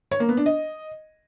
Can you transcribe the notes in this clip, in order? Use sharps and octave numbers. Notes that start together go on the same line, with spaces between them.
C#5
A#3
B3
D4
D#5